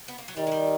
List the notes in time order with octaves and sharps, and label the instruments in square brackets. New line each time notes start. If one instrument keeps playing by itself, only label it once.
[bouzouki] B3
A#3
F#3
[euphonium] D#3 [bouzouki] G3
[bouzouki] G#3
G3